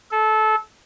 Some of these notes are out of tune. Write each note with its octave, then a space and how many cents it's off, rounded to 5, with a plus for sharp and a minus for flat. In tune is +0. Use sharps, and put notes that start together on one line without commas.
A4 -20